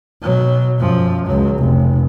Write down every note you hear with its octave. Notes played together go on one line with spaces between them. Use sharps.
B2 F#3
F#2 F3
C#2 F#3
F1